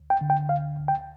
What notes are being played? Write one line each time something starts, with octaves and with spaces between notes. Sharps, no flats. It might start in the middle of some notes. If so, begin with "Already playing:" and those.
Already playing: D2
G5
D3
G5
D2 F5
D2
G5